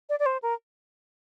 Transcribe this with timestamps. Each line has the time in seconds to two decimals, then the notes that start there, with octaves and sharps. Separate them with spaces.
0.09 D5
0.20 D5
0.26 C5
0.42 A#4